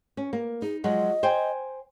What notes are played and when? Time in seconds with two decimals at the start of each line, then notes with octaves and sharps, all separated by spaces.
0.17 C#4
0.33 A#3
0.62 D#4 G#4
0.84 F3 F#3 G#3 D#5
1.23 C5 G5 G#5